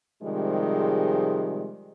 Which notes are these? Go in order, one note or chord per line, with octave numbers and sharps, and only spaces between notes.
C3 D#3 F3 G3 G#3